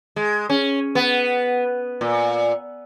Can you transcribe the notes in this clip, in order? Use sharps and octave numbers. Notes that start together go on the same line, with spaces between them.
G#3
C#4
B3
A#2